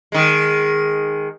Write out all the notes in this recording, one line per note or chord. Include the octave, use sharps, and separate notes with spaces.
D#3 G#3